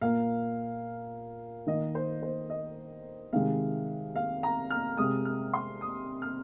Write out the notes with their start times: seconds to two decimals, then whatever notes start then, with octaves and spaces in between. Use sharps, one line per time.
0.01 A#2 A#3 F5
1.67 D#3 A#3 D#5
1.95 C5
2.22 C5
2.50 D#5
3.33 C3 D#3 G#3 F5
4.16 F5
4.43 A#5
4.70 F6
4.97 C3 G#3 D#6
5.25 F6
5.54 C6
5.81 D#6
6.22 F6